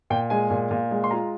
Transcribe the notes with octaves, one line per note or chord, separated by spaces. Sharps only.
A#2 G5
G#3 G#5
A#2
A#2
G#3
C6
F4 A#5